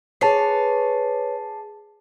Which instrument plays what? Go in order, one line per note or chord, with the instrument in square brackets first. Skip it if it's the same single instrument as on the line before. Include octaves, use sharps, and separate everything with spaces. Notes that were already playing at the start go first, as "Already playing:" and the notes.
[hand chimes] G#4 A5 C7 [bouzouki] B4 C#5